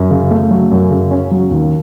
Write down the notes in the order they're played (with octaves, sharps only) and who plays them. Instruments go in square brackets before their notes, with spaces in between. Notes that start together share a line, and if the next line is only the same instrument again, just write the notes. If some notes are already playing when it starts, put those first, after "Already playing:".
Already playing: [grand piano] F#2
C#3
A3
F#3
F#2
C#3
C#4
F#3
D#2